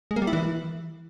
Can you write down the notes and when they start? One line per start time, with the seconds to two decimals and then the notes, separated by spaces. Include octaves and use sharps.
0.11 G#3
0.16 A#3
0.22 G3
0.27 E4
0.33 E3